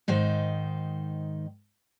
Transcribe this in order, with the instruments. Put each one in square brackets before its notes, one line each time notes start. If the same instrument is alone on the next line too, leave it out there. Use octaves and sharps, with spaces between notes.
[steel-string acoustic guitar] G#2 D#3 D#4 C5